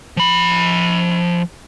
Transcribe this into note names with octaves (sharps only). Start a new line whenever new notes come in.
F3 B5